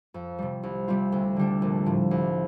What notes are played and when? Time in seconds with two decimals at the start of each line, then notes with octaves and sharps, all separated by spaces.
0.14 F2
0.39 C3 G3
0.63 C2
0.88 C3 G3 C4 F4
1.12 D2
1.36 D3 G3 D4
1.62 A#1
1.86 A2 F3
2.11 C2